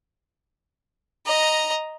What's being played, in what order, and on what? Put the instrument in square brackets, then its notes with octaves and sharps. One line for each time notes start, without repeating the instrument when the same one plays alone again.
[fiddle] D#5 A#5